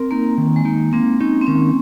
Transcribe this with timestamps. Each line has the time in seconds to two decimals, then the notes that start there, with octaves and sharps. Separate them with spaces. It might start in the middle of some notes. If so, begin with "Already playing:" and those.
Already playing: C4 A#4
0.11 A#3 D#4
0.38 D#3
0.56 G#3
0.65 A#3 D#4
0.93 A#3 C4
1.21 C#4 D#4
1.41 C4
1.47 D#3 C#4